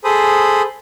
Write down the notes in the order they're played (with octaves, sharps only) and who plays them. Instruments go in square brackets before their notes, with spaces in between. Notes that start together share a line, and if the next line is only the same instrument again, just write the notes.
[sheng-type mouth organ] G#4 A4 C5 B5 D#6